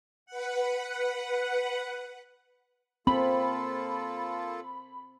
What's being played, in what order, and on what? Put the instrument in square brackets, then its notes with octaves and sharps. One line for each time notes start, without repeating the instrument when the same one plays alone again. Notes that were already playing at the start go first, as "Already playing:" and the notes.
[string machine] B4 F#5
[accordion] A#3 F4 A4 [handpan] C4 [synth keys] B5